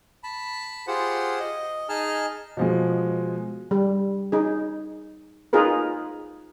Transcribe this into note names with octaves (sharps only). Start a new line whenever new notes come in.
A5 B5
F4 G4 G#4 C5 F#5
D#5
D#4 G#4 D#5 G#5 A5 F6
B2 F3 G#3
G3
D#4 G#4
D#4 F4 G#4 A#4 B4